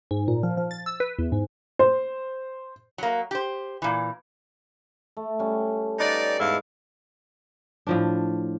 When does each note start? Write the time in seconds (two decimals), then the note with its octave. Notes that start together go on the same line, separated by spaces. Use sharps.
0.11 G#2
0.28 A#2
0.43 F3
0.57 F3
0.71 A6
0.86 E6
1.00 B4
1.19 E2
1.32 G#2
1.79 C5
2.98 F#3 A#3
3.31 G4 C5
3.82 A#2 E3
5.17 A3
5.39 G3 C#4
6.00 D#4 B4 D5 F5
6.39 E2 G#2 E4 F5
7.87 A2 F3 D4